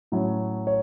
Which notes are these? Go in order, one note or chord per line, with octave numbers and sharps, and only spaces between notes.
A2 F#3 C#4
C#5